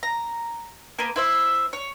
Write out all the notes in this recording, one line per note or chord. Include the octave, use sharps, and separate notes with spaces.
A#5
A#3 B3
E4 C5 E5
C#5